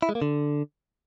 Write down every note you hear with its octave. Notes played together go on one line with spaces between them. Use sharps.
E4
G#3
A#3
D3